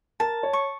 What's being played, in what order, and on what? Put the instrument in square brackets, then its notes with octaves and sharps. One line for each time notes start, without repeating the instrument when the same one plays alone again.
[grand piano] A#4 [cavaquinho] A5
[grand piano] C#5
[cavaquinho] C#6